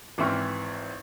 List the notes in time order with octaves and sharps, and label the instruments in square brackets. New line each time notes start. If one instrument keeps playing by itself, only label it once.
[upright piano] G#1 E3 C4 E5 C#6 F6